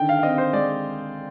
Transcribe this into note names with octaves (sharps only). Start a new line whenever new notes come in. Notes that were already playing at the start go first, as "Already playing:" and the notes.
Already playing: D3 D#3 G5
F5
F5
C4 D#5
C5
G#3 D5